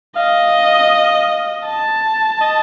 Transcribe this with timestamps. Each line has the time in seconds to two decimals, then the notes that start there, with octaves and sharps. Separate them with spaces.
0.17 D#5 F5
1.66 A5
2.41 D#5